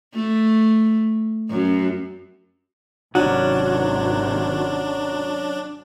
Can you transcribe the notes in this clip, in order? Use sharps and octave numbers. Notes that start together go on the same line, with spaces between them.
A3
F#2
G#1 C3 D#3 F#3 C#4 D4 F#4